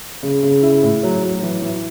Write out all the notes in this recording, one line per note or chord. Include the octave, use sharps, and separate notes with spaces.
C#3
C#3
E4
A2
F#3
F#3
E3
E3